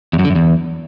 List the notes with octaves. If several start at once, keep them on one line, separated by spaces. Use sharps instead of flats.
E2
F#2
D3
F#2
E2